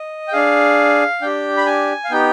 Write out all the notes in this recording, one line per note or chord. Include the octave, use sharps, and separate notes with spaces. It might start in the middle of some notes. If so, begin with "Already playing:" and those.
Already playing: D#5
G5
D4 G#4 F5
D4 G4 G5
B5
G#5
F5
B3 D#4 G4 G5